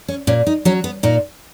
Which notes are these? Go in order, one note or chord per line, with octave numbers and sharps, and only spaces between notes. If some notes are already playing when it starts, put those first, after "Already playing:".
C#4
A#2 C#4
D#4
F#3 C#4
B3
A#2 D#4